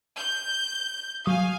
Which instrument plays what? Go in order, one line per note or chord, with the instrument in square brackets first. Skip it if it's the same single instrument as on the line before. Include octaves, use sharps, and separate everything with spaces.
[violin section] G6
[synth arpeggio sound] F#3 D#6 [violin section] F5 G#5